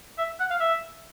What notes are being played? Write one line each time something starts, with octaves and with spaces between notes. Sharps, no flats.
E5
F#5
F5
E5